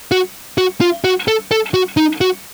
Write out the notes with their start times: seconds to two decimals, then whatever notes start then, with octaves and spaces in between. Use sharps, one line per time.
0.12 F#4
0.58 F#4
0.81 F4
1.04 F#4
1.28 A4
1.51 A4
1.74 F#4
1.97 D#4
2.21 F#4